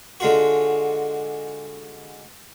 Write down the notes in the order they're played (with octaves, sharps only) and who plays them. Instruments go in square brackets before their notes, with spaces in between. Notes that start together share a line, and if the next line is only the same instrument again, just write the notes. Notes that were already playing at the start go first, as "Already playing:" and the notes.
[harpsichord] D3 G#3 F4 F#4